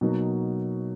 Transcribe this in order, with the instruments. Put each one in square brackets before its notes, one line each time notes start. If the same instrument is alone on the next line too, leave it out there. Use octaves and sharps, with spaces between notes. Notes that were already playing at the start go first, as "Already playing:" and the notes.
[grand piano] B2 F#3 A#3 D#4